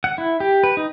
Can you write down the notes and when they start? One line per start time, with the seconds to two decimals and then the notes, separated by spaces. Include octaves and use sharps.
0.04 F#5
0.18 E4
0.40 G4
0.63 B4
0.77 D#4